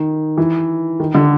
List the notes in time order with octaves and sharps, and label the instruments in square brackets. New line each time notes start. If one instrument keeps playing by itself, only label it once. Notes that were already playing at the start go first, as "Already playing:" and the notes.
Already playing: [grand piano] D#3
E3
D#3
D3